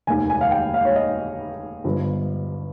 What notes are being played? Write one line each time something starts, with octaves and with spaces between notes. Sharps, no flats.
F1 D#2 D#3 G#5
G#5
F5
G5
F5
C#5
D#5
G1 G2 F3